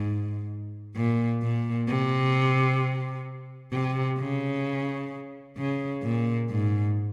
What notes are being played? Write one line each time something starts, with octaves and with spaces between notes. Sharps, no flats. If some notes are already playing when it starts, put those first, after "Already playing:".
Already playing: G#2
A#2
A#2
C3
C3
C#3
C#3
A#2
G#2